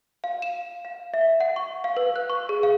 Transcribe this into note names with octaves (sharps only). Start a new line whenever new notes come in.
F5
E7
F5
E5
F#5
C#6
F5
B4
F#6
C#6
G#4
F5